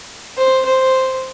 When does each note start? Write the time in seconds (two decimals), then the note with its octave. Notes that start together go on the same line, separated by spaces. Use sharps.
0.38 C5
0.66 C5